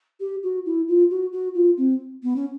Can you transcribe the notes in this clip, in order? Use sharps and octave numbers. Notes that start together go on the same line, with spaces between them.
G4
F#4
E4
F4
F#4
F#4
F4
C4
B3
C#4